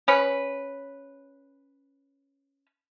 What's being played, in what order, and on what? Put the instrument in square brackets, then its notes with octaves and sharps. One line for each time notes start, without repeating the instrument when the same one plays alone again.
[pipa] C#4 B4